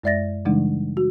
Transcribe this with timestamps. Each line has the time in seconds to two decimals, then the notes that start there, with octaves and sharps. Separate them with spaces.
0.03 F#2 G#3 D5 E5 A6 A#6
0.45 C#3 E3 G3 G#3 D4 D#4
0.97 F#4